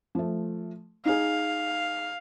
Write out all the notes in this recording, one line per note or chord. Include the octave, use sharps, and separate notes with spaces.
F3 A3
D#4 G#4 F5